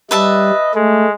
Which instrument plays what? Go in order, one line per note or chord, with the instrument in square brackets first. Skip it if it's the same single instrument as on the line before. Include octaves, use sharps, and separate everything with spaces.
[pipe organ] G3 [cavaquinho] B4 E5 A5 [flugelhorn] D#5
[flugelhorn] G#3 [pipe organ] A3